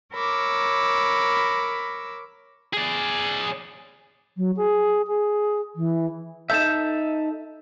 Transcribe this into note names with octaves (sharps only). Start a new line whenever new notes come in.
A#4 C#5 B5 D6 E6
G#4 D5
F#3
G#4
G#4
E3
D#4 A4 E5 G6 E7